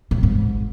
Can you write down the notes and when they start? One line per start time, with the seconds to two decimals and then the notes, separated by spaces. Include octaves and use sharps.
0.11 A2
0.23 G#2